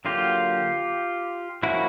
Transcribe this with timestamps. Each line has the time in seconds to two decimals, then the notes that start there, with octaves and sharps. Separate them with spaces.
0.05 D3 F#3 A#3 F4 G4
1.63 F3 A#3 C#4 E4 F#4